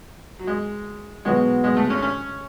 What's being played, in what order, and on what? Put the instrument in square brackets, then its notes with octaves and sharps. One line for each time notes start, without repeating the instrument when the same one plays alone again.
[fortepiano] F#3
G#3
[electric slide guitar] B2 F#3 B3 F#4 [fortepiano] G#3
[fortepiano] G#3
A3
C#4
C#4